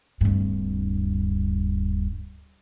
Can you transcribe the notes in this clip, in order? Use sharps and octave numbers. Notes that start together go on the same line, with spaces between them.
D1 G2